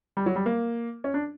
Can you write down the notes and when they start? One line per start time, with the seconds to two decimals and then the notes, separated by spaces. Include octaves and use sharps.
0.17 G3
0.26 F#3
0.36 G3
0.46 A#3
1.04 C#4
1.14 D4